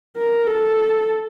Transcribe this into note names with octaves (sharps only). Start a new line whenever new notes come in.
A#4
A4